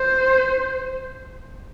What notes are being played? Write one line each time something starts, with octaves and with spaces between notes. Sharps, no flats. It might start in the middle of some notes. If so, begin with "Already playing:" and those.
Already playing: C5